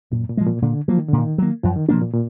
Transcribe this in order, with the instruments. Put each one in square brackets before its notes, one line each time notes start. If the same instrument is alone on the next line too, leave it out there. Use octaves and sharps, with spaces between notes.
[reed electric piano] F#2 [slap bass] A#2
[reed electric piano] A#2
[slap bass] F3 G#3
[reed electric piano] A#2
[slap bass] A#2 [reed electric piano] D3
[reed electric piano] F3 [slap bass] F#3 A#3
[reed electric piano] D#3
[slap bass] A#2 [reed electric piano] D3
[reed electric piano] D#3
[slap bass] F#3 A#3
[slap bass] F#2 [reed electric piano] F3
[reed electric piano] D#3
[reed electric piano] B2 [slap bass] F3 A#3 D4
[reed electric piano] A#2
A#2